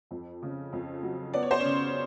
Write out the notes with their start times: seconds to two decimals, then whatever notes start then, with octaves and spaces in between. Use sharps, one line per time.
0.11 F2
0.43 C#3
0.73 F2
1.03 F#3
1.34 B3 D5
1.43 C#5
1.51 C5
1.60 C#4 C#5
1.65 C#3